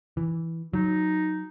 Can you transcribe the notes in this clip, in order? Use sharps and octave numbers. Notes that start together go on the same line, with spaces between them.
E3
F#3 D#4